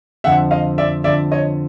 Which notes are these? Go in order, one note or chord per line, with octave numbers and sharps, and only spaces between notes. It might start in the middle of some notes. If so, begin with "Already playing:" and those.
F2 D3 F3 E5 F#5
D#5 F5
D5 E5
F2 D3 F3 D5 E5
C#5 D#5